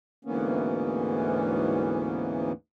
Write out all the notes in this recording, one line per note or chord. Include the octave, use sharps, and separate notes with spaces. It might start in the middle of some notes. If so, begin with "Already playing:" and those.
D2 G#2 E3 A#3 B3 C#4